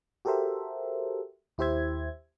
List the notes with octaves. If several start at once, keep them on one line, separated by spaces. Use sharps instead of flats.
F#4 G4 A4 A#4 C5 E5
D#2 E4 G4 C5 E5 G#6